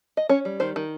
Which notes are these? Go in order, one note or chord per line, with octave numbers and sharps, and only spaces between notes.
D#5
C#4 C#5
G3
D#3 C5
D#3